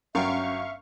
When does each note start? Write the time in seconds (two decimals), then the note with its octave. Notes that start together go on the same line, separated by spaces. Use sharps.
0.15 G1 F#3 C#4 E5 F5 G5 C#6